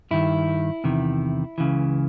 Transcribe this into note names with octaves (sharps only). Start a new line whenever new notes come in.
G2 D#3 E4
E2 C3 D#3
C#2 C#3 E3